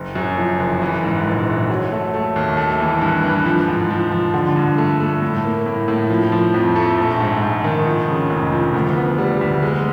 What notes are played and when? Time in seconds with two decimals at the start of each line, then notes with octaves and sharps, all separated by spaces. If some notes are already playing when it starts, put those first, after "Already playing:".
Already playing: F#1
0.15 F#2
0.37 F3
0.59 F#1
0.82 E3
1.04 G#2
1.25 A#1
1.47 A#1
1.70 F#3
1.92 A3
2.14 A3
2.36 D#2
2.57 A3
2.79 E3
3.01 G2
3.24 E3
3.46 F3
3.68 G#2
3.90 F3
4.12 F3
4.34 D3
4.56 G2
4.78 A3
5.00 A3
5.22 A2
5.44 A#3
5.66 A2
5.88 A2
6.10 F3
6.32 F3
6.54 F2
6.76 A3
6.98 A#1
7.20 G#2
7.42 G#2
7.64 D#3
7.86 F3
8.08 C#3
8.30 F1
8.52 F3
8.74 D2
8.96 B3
9.18 G3
9.41 D2
9.63 G#3